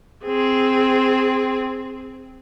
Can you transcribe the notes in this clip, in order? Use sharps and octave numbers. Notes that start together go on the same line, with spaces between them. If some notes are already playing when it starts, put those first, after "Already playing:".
C4 G#4